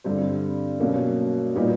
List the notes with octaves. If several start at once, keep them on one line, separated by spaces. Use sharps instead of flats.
G2 D3 G3 C4
B2 F#3 A#3 C#4
A#2 G3 B3 D#4 G4